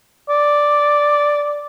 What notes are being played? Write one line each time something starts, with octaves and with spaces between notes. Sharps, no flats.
D5